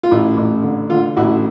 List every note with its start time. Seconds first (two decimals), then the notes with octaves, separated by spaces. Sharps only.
0.03 F4
0.11 A1 E4
0.37 A1
0.64 D3
0.90 D3 F4
1.17 A1 E4 F#4